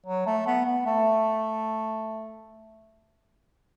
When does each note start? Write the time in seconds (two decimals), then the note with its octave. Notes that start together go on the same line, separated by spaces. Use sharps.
0.06 F#3
0.26 A3
0.47 B3
0.66 B3
0.86 A3